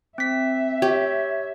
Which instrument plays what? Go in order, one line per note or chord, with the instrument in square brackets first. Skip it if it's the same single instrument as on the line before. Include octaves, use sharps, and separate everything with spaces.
[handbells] C4 B6 [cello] E5
[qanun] G4 [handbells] C#5